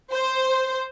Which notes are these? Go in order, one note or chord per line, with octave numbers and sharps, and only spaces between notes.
C5